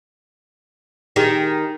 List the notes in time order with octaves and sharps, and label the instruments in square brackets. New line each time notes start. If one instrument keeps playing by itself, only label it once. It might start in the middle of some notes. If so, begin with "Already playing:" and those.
[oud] D#3 [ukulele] D#4 G4 G#4